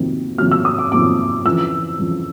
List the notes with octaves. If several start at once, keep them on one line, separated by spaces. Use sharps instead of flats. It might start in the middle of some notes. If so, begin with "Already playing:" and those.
Already playing: F2 C3 D#3 F#3 A#3
F2 C3 D#3 F#3 A#3 F6
E6
D#6
D6
F2 C3 D#3 F#3 A#3 D6
F2 C#3 E3 E6
F2 C#3 E3